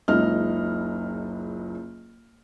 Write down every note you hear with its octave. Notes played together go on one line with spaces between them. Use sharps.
F#1 C#2 D#4 D#5 F6